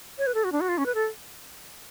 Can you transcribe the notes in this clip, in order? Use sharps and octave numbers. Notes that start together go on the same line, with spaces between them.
C#5
B4
A4
F#4
D4
F#4
F4
C#4
B4
A4